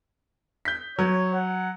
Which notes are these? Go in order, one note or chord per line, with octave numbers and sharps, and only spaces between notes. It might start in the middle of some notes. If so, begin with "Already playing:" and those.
G6 B6
F#3 C#5
F#5